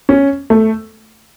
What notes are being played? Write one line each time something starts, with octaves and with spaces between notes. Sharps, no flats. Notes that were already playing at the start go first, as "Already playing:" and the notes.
C#4
A3